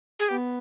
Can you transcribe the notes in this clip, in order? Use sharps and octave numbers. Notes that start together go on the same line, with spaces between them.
G#4
B3 G4